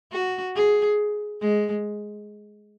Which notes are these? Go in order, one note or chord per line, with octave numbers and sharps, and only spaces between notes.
F#4
G#4
G#3